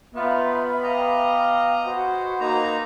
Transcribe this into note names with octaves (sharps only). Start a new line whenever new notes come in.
B3 D#4 F4 E5 B5
G4 D#5 F5 A#5
G#3 F#4 B4 C5 F#5
A#3 D#4 A#5